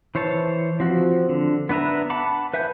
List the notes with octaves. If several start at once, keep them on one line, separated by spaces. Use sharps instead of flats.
E3 C5 C#5 A5
F3 C4 F#4
D3
B3 D4 B4 E5 A#5
F#5 A5 B5 D6
B4 E5 F#5 G#5 G6